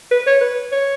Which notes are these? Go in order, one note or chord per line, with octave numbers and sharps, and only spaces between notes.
B4
C#5
B4
C#5